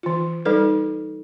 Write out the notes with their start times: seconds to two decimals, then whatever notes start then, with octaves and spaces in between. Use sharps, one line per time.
0.03 E3 F4
0.45 G3 D#4 A4 B4